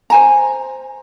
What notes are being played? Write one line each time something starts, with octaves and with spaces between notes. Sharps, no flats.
C5 G#5 A#5